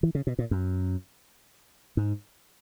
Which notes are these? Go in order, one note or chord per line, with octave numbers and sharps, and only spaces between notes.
E3
C#3
B2
A#2
F#2
G#2